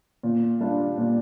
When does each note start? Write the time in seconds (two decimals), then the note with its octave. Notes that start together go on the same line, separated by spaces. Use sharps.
0.23 A#2
0.60 G3 D4 F4
0.98 A#2